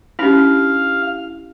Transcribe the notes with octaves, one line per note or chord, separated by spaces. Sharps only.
C#4 D4 E4 G4 F5